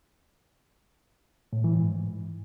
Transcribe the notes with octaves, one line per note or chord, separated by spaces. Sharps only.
A2
E3
G#2